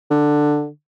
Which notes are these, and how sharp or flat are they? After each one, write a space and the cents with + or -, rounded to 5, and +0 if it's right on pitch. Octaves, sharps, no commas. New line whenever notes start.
D3 +10